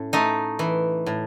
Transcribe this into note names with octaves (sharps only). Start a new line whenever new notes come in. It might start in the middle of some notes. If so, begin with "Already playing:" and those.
Already playing: A2 C#4
A3 D#4
E3
A2